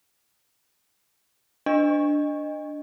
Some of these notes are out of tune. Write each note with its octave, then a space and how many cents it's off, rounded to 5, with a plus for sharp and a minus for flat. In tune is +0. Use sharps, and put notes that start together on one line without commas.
D4 +0 D#5 -15